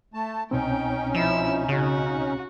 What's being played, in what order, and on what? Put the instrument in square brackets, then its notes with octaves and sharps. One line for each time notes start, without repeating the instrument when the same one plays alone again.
[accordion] A3 A5
[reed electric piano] C2 B2 C4 [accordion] C#4 D#4 [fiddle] G5
[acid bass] F3 [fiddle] E4 E6
[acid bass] C#3 [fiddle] F#4